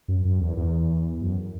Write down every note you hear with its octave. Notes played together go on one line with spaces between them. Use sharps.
F#2
F#2
E2
E2
F#2